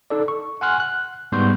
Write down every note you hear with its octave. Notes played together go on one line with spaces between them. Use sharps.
D#4 A4 D5
C#6
F#5 G#5 C6 F6 F#6
F#6
G#2 G3 B3 C6 C#6 G6